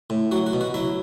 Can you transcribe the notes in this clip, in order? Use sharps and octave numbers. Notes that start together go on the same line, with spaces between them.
A2
F#3 F#4
F#4
B2
F#4
F#3 E4